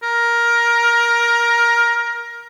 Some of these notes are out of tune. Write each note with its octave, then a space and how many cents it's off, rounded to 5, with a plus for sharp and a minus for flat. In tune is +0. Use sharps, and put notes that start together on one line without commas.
A#4 +15